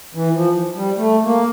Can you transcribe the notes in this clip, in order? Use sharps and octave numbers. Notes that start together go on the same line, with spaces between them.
E3
F3
G3
A3
A#3